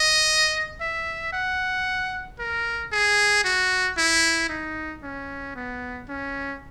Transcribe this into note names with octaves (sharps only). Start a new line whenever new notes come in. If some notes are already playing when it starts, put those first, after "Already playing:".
Already playing: D#5
E5
F#5
A#4
G#4
F#4
E4
D#4
C#4
B3
C#4